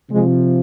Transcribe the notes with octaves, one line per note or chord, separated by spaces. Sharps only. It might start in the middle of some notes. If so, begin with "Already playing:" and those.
C3 F3 G#3